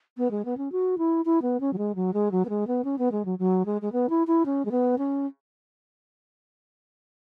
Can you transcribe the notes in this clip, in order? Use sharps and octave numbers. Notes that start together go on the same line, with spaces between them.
B3
G#3
B3
C#4
F#4
E4
E4
B3
C#4
F#3
G#3
F#3
G#3
F#3
B3
G#3
B3
C#4
B3
G#3
F#3
F#3
G#3
G#3
B3
E4
E4
C#4
G#3
B3
C#4